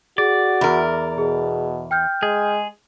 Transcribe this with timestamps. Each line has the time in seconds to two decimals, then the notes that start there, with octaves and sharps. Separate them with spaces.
0.18 F#4 G#4 D5
0.61 E2 A#4
1.18 B2 G#4
1.91 G5 F6 G6
2.23 G#3 G#4